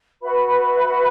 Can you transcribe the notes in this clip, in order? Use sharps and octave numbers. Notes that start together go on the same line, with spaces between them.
F#4 B4 E5 B5